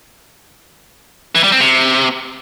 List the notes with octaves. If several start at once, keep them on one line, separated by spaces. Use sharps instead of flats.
E3
G3
C4
C3